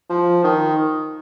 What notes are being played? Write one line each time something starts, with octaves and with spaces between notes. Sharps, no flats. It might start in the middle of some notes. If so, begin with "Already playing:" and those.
F3
D#3